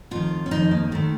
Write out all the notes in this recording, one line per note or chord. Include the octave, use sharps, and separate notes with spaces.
F2 D#3 F4
C#4
F2 D#3 D#4
A#3
F#2 D#3 A3